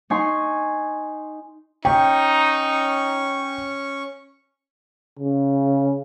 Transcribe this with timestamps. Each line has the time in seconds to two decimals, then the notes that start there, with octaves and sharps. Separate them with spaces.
0.10 D#4 G#5 C6 C#6
1.85 C#4 D#4 G5 C#6
5.19 C#3